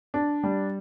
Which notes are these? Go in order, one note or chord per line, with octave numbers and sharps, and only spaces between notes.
D4
G3